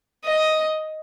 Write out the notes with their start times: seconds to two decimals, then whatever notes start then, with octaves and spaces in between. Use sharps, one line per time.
0.25 D#5